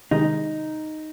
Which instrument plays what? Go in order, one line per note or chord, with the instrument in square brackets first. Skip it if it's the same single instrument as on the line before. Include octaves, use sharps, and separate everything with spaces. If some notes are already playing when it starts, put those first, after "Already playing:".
[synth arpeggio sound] C3 D#3 G#3 [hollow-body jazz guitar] D#4